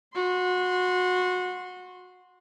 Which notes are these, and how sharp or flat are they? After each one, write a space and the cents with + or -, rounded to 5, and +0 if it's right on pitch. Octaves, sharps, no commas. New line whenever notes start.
F#4 -25 C6 +0